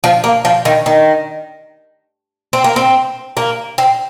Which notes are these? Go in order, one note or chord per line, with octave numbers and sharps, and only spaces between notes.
F3
A#3
F3
D#3
D#3
C4
A#3
C4
A#3
C4